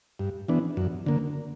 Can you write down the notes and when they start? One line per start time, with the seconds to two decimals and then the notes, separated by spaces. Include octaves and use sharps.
0.19 G2
0.48 E3 B3 D4
0.77 F#2
1.06 D3 A#3